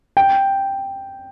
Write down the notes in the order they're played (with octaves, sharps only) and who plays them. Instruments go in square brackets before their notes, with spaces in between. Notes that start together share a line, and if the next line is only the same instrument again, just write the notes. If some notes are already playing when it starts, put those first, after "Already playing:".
[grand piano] G5